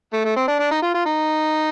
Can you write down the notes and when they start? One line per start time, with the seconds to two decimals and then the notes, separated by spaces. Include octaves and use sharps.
0.13 A3
0.24 A3
0.36 C4
0.48 D4
0.59 D4
0.71 D#4
0.82 F4
0.94 F4
1.06 D#4